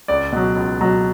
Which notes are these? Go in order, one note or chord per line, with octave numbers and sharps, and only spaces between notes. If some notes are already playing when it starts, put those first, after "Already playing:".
C#2 D5
B2 F#3
C#2
B2 F#3